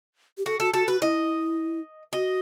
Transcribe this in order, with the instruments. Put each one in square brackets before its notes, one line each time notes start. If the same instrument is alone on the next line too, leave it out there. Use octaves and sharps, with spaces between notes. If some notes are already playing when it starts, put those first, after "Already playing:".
[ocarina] G4
[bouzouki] F#4 [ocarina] A4
[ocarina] F#4 [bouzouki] A4
[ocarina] F#4 [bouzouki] A4
[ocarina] F#4 [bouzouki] B4
[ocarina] E4 [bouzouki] D#5
[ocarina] F#4 [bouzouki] D#5